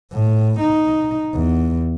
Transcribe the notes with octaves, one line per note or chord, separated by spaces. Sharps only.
A2
D#4
E2